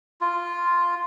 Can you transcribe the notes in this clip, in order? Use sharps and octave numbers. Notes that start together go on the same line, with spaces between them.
F4